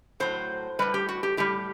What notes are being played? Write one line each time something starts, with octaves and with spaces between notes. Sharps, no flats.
A2 F#3 C5
A2 G3 B4
G4
F#4
G4
A2 G3 G4